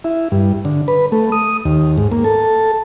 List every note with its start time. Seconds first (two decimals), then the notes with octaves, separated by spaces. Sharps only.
0.04 E4
0.32 G2
0.65 D3
0.88 B4
1.12 A3
1.32 D#6
1.65 D#2
1.97 G#2
2.12 A#3
2.24 A4